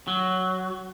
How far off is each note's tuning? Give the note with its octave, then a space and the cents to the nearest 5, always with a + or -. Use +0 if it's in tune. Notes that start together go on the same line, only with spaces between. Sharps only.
F#3 +5